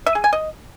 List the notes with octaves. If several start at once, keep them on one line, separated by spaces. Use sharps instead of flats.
E5
G#4
G#5
D#5